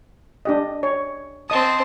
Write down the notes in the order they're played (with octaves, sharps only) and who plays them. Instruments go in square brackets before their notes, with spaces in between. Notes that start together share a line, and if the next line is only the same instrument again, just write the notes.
[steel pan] D4 G4 D#5
C#5
[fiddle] C4 A5 [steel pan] D#5 D#6